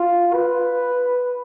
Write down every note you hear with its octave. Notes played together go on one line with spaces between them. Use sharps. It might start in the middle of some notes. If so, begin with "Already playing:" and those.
Already playing: F4
B4